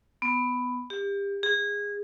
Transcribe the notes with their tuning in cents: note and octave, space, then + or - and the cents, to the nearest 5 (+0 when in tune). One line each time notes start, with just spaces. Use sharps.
B3 +10
G4 +30
G#4 -20